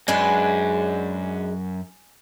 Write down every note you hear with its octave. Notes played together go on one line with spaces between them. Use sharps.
F#2 G#3 D4 B4 G#5